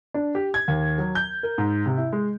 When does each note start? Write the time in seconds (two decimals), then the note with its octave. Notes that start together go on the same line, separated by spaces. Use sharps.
0.14 D4
0.35 G4
0.54 G#6
0.68 D#2
0.98 F#3
1.15 G6
1.43 A#4
1.58 G#2
1.86 C3
1.97 E4
2.12 G#3